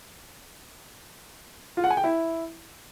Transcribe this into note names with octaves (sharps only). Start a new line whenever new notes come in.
F4
F#5
G#5
G5
E4